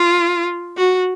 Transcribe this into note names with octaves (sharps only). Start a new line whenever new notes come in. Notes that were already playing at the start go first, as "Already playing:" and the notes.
Already playing: F4
F#4